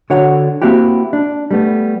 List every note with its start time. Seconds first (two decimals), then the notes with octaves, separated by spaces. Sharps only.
0.10 D3 F#4 C#5 F#5
0.62 A#3 C4 E4 F#4 G4
1.13 D4
1.51 G3 A3 B3